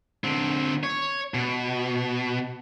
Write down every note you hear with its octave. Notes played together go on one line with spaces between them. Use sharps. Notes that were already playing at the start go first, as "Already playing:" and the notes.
D3 C4
C#5
B2